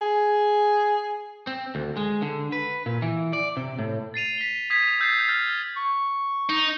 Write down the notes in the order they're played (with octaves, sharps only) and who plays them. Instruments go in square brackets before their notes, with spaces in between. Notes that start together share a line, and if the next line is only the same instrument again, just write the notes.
[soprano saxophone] G#4
[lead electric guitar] C4
D2
G#3
D3
B4
A#2
E3
D5
C3
A2
[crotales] A6 C7 D#7 F7
B6 G7
D#6 G#6 B6 C7 D#7 F7
E6 G6 A6 B6 C7
F6 G6 A6
[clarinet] C#6
[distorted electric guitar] D#4